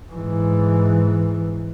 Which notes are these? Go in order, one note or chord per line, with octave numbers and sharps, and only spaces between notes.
G#2 E3